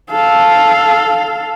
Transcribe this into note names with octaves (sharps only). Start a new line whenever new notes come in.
A4 F5